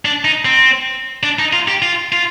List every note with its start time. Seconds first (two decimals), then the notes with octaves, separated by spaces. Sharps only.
0.05 D4
0.25 D#4
0.45 C4
1.23 D4
1.39 D#4
1.53 F4
1.68 G4
1.82 F4
2.12 F4